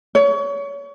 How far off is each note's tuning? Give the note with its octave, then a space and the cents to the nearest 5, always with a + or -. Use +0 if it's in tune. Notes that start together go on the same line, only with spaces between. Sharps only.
C#5 +30